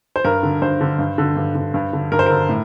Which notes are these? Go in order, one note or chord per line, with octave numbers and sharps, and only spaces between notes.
C5
G2 A#4
D3
G2 C5
D3
G2
D3
G2
D3
G2
D3
G2 A#4
C5
D3 A#4
A2